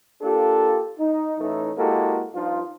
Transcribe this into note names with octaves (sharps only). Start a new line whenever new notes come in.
A#3 D4 F4 G4 A4
D#4
A2 E3 A3 C#4 D#4
G#3 A#3 E4 F#4 G4 A4
G2 F3 D#4 F4